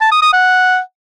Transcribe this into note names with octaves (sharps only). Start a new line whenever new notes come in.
A5
D#6
D#6
F#5